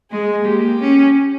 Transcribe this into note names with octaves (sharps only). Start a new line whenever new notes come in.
G#3 G#4
A#3 G4
C#4